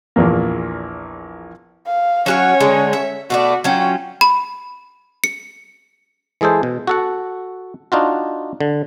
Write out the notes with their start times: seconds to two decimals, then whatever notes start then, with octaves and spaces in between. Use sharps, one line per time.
0.16 A#1 E2 A#3
1.87 F5
2.26 F#3 C#4 F#4 C#5 F5
2.60 D3 G#3
2.93 E5
3.30 B2 A3 F#4 D5
3.64 F#3 C#4 F4 F#5 G5
4.21 B5
5.24 C#7
6.41 E3 G#3 G#4 A4 C5
6.63 B2
6.87 F#4 A4 F#5
7.92 D4 D#4 F4 F#4
8.60 D3